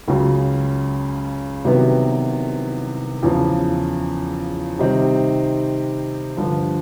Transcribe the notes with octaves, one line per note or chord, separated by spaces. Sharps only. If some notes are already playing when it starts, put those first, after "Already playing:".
C#2 C#3 F#3
C2 C3 D#3 F#3 B3
E2 C#3 F3
C3 D#3 G3 C4 D#4
G2 D3 F3